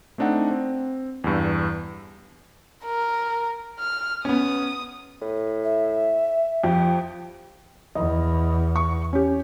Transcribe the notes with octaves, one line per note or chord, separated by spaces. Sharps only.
A3 C4 D4 D#4 F#5
C4
E2 G2
A#4
F6
B3 C#4 D#6
A2
E5
F2 F3 G4
E2 D#5
C#6
C#4 G4